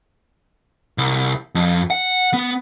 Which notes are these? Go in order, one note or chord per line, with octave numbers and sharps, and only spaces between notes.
C2
F2
F#5
B3